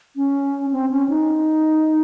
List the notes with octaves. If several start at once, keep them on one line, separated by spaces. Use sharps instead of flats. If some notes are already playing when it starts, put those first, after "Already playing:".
C#4
C4
C#4
D#4